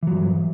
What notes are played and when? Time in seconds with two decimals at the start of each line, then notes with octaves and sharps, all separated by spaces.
0.03 E3
0.07 F#3
0.12 G2